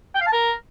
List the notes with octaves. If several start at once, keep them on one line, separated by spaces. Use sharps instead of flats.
G5
F5
A5
A#4